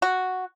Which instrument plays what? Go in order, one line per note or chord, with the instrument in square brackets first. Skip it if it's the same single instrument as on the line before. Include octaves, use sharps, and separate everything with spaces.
[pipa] F#4